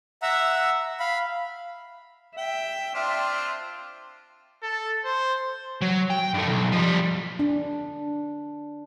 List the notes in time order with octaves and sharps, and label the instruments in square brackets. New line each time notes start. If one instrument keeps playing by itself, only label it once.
[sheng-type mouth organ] E5 F#5 A#5 E6
F5 B5
[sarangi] E5 [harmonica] G5
[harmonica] C4 D4 F4
[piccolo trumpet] A4
C5
[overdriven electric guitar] F#3
G5
G2 A3
B1
F3 G3
[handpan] D4